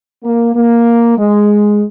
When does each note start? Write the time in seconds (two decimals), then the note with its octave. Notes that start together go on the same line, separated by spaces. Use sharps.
0.23 A#3
0.54 A#3
1.18 G#3